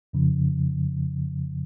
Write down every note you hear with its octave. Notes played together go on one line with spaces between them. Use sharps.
F2 C#3 F3